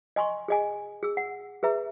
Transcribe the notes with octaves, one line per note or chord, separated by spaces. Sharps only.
D#5 G#5 C6 C#6
G#4 D#5 G#5
G#4 E6
F#5
G#4 B4 E5 A#5